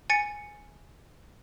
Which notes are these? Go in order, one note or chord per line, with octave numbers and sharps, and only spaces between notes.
G#5 A6 C#7